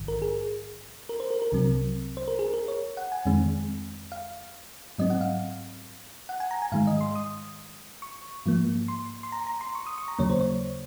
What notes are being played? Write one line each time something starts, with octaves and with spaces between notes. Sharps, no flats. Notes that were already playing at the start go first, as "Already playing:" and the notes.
Already playing: A#1 G#2 D#3
A#4
G#4
A#4
C5
A#4
A#4
C2 C3 F#3 C4
C5
A#4
G#4
A#4
C#5
F#5
G#5
F2 D#3 G#3 C4
F5
G#2 F#3 C4 D#5
F#5
F5
F#5
G#5
A#5
G#5
G#2 D#3 G#3 F5
D#5
C6
D#6
C#6
G#2 F3 A#3
C6
C6
A#5
A#5
C6
C#6
D#6
C#6
A#5
D#2 C#3 F#3 A#3 C#5
C5
C#5